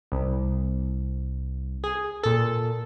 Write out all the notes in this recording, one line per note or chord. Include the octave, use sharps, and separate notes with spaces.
C2
G#4
A#2 A4